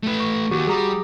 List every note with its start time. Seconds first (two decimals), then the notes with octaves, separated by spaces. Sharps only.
0.03 A3 B4
0.20 C#6
0.51 D#2 F#4 G4
0.67 G3 G#4 A#5 D6